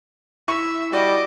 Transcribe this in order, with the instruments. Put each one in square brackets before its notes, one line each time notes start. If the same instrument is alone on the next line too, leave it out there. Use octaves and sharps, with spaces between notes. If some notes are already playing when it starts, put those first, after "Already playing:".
[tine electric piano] E4 [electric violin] E5 E6 [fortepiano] C#6
[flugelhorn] G3 [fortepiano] F#4 D5 [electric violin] D#5 D6